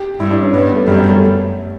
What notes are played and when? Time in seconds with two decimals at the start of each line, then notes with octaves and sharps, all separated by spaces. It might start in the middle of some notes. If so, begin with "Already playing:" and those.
Already playing: G4
0.20 G2 E4
0.31 D4
0.42 C#4
0.53 G2 B3
0.65 B3
0.76 A3
0.87 F#2 G3
0.99 G3
1.09 A3